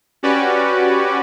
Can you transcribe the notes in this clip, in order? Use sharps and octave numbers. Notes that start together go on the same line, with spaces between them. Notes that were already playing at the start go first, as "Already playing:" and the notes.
C#4 F#4 G4 B4 D5